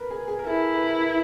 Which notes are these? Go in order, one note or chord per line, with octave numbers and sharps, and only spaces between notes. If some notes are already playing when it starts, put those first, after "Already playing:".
Already playing: A#4 B4
G#4
G#4
A#4
E4 A4
B4
A#4